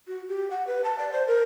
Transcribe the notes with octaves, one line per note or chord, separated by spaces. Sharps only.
F#4
G4
F#5
B4
A5
D5
C5
A#4